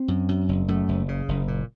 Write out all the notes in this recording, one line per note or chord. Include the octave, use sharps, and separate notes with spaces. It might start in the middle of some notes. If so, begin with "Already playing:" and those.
Already playing: C4
F#2
F#2
F#1
F#2 A3
F#1
C#3
F#1
A#2